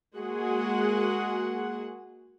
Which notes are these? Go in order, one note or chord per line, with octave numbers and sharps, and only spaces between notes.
G#3 A#3 F#4 G#4 F#5